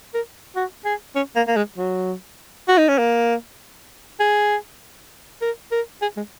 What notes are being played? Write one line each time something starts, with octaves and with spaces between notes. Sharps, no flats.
A#4
F#4
G#4
C#4
A#3
A#3
G#3
F#3
F#4
D#4
C#4
A#3
G#4
A#4
A#4
G#4
G#3